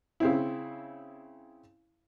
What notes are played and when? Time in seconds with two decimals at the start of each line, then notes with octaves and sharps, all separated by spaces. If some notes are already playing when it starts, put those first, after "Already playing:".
0.20 C#3 C4 E4